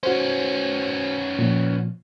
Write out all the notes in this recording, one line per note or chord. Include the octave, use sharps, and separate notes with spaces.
B3 C#4 F#4 C5
A#2 F3